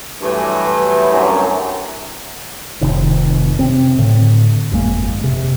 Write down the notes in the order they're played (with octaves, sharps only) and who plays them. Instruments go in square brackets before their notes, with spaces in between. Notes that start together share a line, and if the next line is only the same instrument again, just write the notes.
[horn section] G2 F#3 A3 [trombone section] E3
[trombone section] C2 F#2
[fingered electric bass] F1 C3 D#3
C3 C4
A2 D3
G1 F2 G#3 A#3
C3